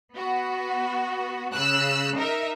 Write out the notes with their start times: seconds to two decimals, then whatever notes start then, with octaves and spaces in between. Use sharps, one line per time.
0.13 B3 F#4
1.53 C#3 E6 F#6
2.17 D#4 A#4 E5